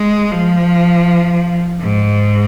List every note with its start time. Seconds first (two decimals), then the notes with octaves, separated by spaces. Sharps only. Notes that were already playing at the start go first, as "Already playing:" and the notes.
Already playing: G#3
0.32 F3
1.81 G#2